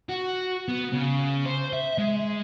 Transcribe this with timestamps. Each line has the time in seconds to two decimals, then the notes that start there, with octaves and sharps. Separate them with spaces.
0.09 F#4
0.69 B3
0.93 C#3
1.45 C5
1.73 E5
1.98 G#3